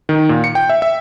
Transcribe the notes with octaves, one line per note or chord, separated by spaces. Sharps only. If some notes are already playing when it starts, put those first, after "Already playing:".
D#3
A#2
C#7
G5
E5
E5